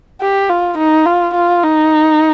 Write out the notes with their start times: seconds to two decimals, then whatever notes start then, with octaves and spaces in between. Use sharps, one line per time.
0.21 G4
0.49 F4
0.77 D#4
1.06 F4
1.34 F4
1.62 D#4